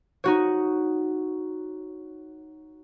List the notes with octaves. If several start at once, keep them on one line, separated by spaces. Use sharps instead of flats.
D#4 F#4 C#5